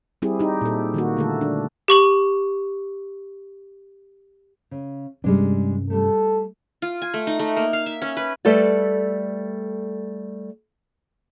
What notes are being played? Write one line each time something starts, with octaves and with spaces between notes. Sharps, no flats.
G3 C4 E4 G4 G#4
D#4 G4
A#2 A4
D#3 A#3 F#4
D3 A3 A4
D4
G4 C#6 F#7
C#3
G2 C3 G3 G#3 C#4 D4
G3 A3 A4
F4
G#5
A3
D#4
A3
A#3
F5
E5
C#4
B4
G3 A3 A4 B4 D5